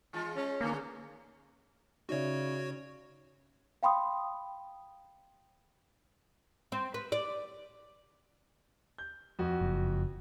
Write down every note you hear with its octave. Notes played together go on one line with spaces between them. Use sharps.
E3 G#3 F4
G#3 C#4
D3 A#3 G#4 C#5
C#3 D#4 F#4 C#5 D5 E5
F5 G5 B5 C6 D#6
C4
B4
D5
G6
F2 F#4
F#1